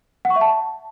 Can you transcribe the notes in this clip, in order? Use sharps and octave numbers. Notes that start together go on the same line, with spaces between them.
F#5
C#6
E5
A5